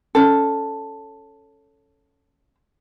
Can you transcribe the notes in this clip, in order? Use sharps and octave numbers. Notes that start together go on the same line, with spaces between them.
C#4 A4